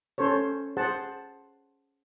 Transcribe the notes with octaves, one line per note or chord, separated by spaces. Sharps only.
C#4 A4 C5 C#5
G#4 C5 F#5 A5